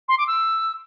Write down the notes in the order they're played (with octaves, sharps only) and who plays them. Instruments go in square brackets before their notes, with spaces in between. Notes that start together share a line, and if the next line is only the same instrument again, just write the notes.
[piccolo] C6
D6
E6